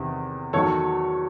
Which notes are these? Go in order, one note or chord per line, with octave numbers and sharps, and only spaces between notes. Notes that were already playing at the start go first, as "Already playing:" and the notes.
Already playing: E2 C3 D#3
E2 D#3 F#3 A4 C#5